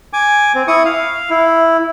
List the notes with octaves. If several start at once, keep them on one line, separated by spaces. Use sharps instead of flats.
G#5 D6
C4
E4 C#6 D#6
F5
E4